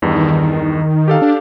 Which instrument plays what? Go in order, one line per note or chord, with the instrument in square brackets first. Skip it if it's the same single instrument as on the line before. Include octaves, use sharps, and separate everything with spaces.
[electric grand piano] E2 G2 [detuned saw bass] D#3
[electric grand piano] G4 A4 F5
[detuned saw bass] D4